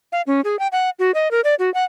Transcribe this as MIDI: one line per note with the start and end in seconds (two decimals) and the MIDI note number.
0.12 0.22 77
0.27 0.41 61
0.45 0.59 68
0.59 0.68 79
0.72 0.90 78
0.99 1.12 66
1.14 1.31 75
1.31 1.41 70
1.44 1.55 74
1.59 1.72 66
1.74 1.84 78